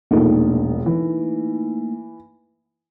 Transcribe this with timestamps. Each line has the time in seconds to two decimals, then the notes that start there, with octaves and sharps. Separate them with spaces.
0.11 E1 A#1 A3 A#3 D#4
0.86 E3